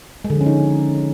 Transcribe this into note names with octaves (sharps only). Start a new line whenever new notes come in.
G#3
D3
F3
C#4
D#4